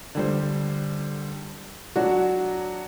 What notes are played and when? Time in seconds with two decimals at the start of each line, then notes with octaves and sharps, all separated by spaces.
0.15 D3 G3 C5
1.96 F#3 D4 F#4